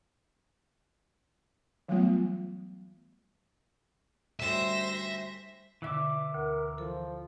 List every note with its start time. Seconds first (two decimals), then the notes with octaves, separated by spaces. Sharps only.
1.88 E3 F#3 G3 A3 B3 F4
4.40 D2 G3 C#4 C5 E5 A#6
5.82 B2 D3 E3 E5 D6 E6
6.34 D2 A#4
6.78 F3 A4